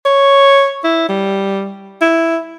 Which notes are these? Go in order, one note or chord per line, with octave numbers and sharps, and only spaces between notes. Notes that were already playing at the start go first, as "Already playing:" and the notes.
C#5
E4
G3
E4